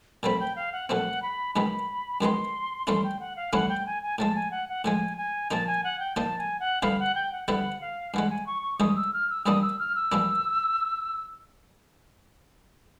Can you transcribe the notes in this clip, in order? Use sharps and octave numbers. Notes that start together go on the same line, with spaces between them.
A#2 F#3 A3 C4 B5
G5
F5
F#5
A#2 F#3 A3 C4 F#5
B5
F#2 D#3 G#3 B3 B5
F#2 D#3 G#3 B3 C6
G2 E3 A3 C#4 E4 C6
G5
F#5
F5
G2 E3 A3 C#4 E4 F#5
G5
G#5
G#5
A2 F3 G#3 A5
G#5
F#5
F#5
A2 F3 G#3 G#5
G#5
A#2 F3 A#3 D#4 A5
G#5
F#5
G5
A#2 F3 A#3 D#4 A5
G#5
F#5
G2 D3 G3 B3 E4 F5
F#5
G5
F#5
G2 D3 G3 B3 E4 F#5
F5
G2 E3 G#3 F#5
G#5
C#6
C#6
G2 E3 G#3 D#6
E6
F6
E6
G2 E3 G3 A#3 D4 D#6
E6
F6
E6
G2 E3 G3 A#3 D4